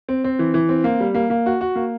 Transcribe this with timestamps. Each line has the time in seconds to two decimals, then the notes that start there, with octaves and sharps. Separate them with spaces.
0.09 C4
0.24 C4
0.39 E3
0.54 E3
0.69 C4
0.84 A#3
1.00 G3
1.15 A#3
1.30 A#3
1.46 F#4
1.61 F#4
1.76 A#3